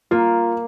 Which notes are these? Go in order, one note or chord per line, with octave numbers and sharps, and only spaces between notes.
A#3 F4